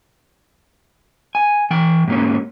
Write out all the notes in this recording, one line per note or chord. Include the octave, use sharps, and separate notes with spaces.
G#5
E3 G5
G#2 A#3 C#4